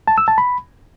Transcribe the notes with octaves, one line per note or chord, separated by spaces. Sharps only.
A5
E6
A5
B5